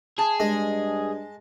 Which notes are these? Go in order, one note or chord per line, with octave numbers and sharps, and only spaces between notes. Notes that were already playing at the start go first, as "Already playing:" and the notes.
G#4 A5
G2 G#3